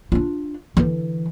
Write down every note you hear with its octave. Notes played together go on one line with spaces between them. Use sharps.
D4 F4
D3 E3